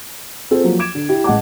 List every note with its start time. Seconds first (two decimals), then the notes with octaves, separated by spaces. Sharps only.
0.51 C4 F4 G#4 A4 C5
0.63 F3 F#3 A#3
0.79 D6 G#6 D7 E7
0.95 D3
1.09 E4 G4
1.24 A1 G#3 D#5 F#5 A5 D6